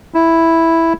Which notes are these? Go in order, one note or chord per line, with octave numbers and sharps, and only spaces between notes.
E4